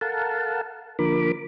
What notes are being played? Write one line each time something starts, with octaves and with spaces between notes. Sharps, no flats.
A4 A#4 F5 F#5 A5
D3 F3 A#3 A#4 B5 D6